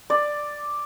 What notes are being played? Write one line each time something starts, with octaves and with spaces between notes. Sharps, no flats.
D5